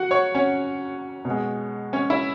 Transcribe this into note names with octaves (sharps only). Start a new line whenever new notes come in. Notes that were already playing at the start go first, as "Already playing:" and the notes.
Already playing: F#4 F#5
C#5 C#6
C#4 C#5
B2
G#3
C#4 C#5
E4 E5